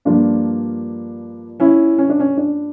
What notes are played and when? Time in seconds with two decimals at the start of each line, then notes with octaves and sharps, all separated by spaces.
0.05 G2 F3 A#3 D4 F4
1.60 C#4 E4
1.98 C#4
2.09 D4
2.20 C#4
2.37 D4